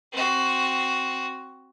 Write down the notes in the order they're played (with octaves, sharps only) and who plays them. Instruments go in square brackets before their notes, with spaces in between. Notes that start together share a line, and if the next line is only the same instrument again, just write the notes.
[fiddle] C4 F#4